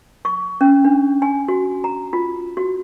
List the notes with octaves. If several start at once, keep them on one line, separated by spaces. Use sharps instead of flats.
C#6
C#4
D4
G#5
F#4
A#5
F4
F#4